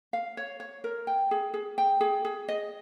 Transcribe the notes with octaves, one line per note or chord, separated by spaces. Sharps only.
F5
C#5
C#5
A#4
G5
G#4
G#4
G5
G#4
G#4
D#5